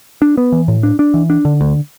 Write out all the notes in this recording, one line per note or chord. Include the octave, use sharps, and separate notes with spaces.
D4
B3
E3
A2
D4
D4
E3
D4
D3
D2